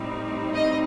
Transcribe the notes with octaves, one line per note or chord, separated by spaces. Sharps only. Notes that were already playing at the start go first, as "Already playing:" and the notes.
Already playing: A2 G3 C4 D#4
D#5